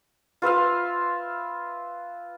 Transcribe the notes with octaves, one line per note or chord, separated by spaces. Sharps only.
F4 B4 E5 F5